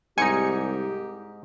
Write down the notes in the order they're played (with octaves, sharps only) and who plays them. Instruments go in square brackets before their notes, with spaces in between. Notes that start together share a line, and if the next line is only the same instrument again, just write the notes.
[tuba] C2 [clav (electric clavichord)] G#2 D#4 [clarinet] G4 [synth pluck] G#5 C#7